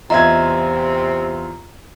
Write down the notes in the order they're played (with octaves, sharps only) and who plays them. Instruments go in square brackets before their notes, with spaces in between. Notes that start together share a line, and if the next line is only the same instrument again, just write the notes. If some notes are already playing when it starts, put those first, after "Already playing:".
[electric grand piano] E2 F4 [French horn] C3 [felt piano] D#5 E5 G#6 [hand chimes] A#5